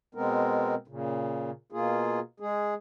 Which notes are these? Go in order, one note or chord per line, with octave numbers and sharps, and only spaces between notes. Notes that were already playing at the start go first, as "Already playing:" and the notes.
B2 G#3 B3 C4 A#4
A#2 C#3
B2 A#3 F4 G#4
G#3 G#4